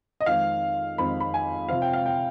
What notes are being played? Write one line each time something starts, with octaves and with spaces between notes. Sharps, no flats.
D#5
F2 D#3 G#3 C4 F5
F2 D#3 G#3 C4 B5
B5
G#5
C3 F3 C4 F5
G5
F5
G5